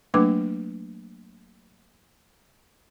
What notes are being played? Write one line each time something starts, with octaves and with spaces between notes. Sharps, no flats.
F#3 A3 A#3 D4 B4 D6